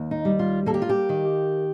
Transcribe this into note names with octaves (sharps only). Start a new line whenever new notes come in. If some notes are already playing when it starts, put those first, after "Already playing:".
Already playing: D#2
D#4
G3
F4
A#3 A4
G4
F4
G4
D#3